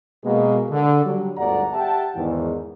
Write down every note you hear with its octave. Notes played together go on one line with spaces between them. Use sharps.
B2 G#3 A#3
D3
F#3 G3
G1 D2 G#2 D5 F#5 A#5
G4 E5 F#5 G5 A5
E2 G#2 D#3